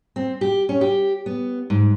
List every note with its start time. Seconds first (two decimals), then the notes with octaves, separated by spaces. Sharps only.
0.16 C4
0.41 G4
0.69 C#4
0.81 G4
1.26 B3
1.70 G#2